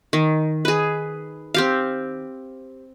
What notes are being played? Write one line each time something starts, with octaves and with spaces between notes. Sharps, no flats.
D#3
G#4 B4
C4 G4 F5